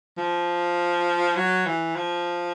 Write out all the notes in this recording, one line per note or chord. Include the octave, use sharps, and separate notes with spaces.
F3
F#3
E3
F3